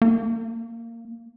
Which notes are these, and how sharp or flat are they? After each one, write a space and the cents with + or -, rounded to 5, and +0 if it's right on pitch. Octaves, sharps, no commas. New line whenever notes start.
A#3 -15